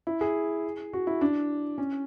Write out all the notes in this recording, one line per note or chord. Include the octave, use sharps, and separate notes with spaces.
E4
G#4
F#4
E4
D4
C#4